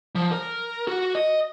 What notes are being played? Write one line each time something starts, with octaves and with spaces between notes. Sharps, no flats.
F3
A#4
F#4
D#5